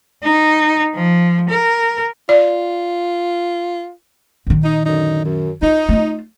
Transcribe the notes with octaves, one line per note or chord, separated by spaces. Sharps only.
D#4
F3
A#4
F4 D5
A#2 D#3
D#4
F#2 D3 D#4
F#2
D#4 F4
A3 F4